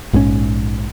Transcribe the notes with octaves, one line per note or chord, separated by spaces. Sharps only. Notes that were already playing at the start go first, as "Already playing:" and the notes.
A#1 G#2 E3 C#4